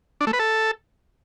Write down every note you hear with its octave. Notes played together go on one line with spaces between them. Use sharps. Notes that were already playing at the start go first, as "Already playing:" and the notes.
D4
A3
B4
A4